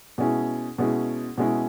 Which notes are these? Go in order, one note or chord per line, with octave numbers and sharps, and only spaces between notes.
B2 G#3 C#4 E4 G#4
B2 G#3 C#4 E4 G#4
B2 G#3 C#4 E4 G#4